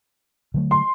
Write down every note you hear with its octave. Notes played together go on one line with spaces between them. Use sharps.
D3 F#3 A3
C6